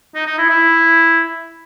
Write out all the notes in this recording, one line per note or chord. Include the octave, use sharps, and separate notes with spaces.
D#4
D#4
E4
E4